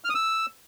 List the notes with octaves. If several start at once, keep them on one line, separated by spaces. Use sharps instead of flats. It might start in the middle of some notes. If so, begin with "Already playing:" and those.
F6
D#6
E6